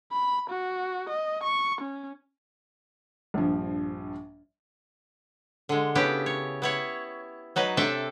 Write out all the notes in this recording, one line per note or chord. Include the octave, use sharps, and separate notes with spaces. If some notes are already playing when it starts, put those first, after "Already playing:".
B5
F#4
D#5
C#6
C#4
A#1 G2 F3
D3 G#3
C#3 B3 D4 E4 G4 G5
C#5
B3 E4 C#5
F#3 D#4 B4
C3 D4 A4 E5 G5 A5